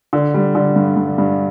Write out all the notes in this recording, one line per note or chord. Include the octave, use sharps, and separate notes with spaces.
D3
G3
D3
G2
G2
G2